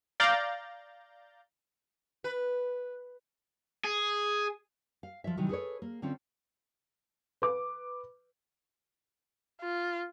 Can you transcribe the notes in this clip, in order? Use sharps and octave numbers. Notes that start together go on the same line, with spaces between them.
D5 F5 A#5 G6 A6
B4
G#4
F5
F3 F4 C#5 E5
C3 D#3 E3 F#3 G3
G#4 A4 B4 C#5
A#3
D3 C4 C#4 F4
B4 D6
F4